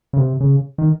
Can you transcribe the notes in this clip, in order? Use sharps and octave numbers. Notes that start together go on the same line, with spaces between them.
C#3
C3
C#3
D#3